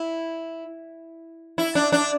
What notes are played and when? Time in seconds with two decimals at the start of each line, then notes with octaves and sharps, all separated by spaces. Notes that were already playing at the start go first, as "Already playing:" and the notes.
Already playing: E4
1.58 E4
1.75 D4
1.92 D4